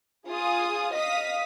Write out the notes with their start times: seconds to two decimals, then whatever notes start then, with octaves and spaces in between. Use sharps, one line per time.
0.27 F4 G#4 F5 D#6
0.93 D#5 F5 D#6 B6